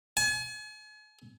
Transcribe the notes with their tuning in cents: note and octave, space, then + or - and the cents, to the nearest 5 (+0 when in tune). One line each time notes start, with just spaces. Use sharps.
G#5 +40